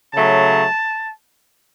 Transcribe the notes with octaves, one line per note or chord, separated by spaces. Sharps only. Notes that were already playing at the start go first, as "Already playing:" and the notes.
C#3 F#3 A3 A5